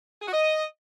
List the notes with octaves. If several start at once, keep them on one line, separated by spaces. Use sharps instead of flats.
G#4
F#4
D#5